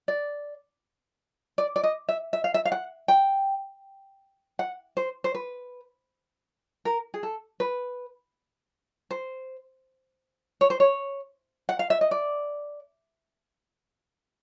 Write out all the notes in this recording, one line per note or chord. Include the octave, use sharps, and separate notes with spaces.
D5
D5
D5
D#5
E5
E5
F5
E5
F5
F#5
G5
F#5
C5
C5
B4
A#4
G#4
A4
B4
C5
C#5
C5
C#5
F#5
F5
E5
D#5
D5